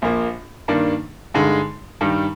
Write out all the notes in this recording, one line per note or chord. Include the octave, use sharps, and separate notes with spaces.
A#1 A#2 F3 A#3
G2 D#3 A#3 D4
G2 D3 G#3 D#4
G2 D#3 G3